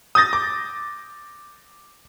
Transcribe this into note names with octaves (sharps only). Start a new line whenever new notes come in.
D#6 G6 A6 A#6
D6